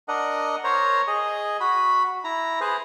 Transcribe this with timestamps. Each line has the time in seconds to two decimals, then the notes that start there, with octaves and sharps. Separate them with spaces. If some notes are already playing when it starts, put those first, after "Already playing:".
0.08 D4 A#4 D#5 F#5
0.64 A#4 C5 C#5 A#5
1.07 G#4 D#5
1.60 F#4 B5
2.24 E4 A#5
2.61 G#4 B4 C5